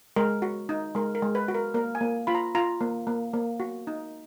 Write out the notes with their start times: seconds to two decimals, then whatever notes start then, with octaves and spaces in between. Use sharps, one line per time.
0.16 G#3 A#4
0.42 F#4
0.69 D#4
0.95 G#3 A#4
1.15 A#4
1.22 G#3
1.35 B4
1.48 F#4
1.54 A#4
1.74 A#3 A#4
1.95 G#5
2.01 A#3
2.27 F4 B5
2.35 A#5
2.55 F4 A#5
2.81 A#3
3.07 A#3
3.34 A#3
3.60 F#4
3.87 D#4